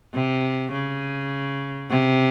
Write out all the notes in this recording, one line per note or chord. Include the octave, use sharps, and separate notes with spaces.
C3
C#3
C3